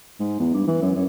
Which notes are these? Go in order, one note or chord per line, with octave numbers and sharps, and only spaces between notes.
G#2
E2
G2
E3
F#2
F#2